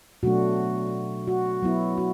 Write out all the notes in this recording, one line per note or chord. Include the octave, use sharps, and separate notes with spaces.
B2 F#3 A3 D4 F#4
F#4
F#3 B3 E4
F#4